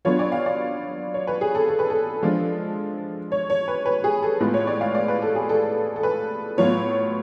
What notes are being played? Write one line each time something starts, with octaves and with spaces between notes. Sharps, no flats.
F#3 B3 D4 F4 C#5
D5
F5
D5
C#5
B4
G#4
A4
A4
B4
A4
F3 G#3 D4 F4
C#5
C#5
B4
B4
G#4
A4
A2 G#3 B3 F4 B4
C#5
D5
F5
D5
B4
A4
G#4
A4
A4
B4
A2 F#3 B3 F4 C#5